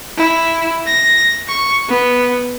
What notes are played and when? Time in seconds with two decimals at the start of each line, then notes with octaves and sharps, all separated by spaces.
0.17 E4
0.87 A#6
1.48 C#6
1.89 B3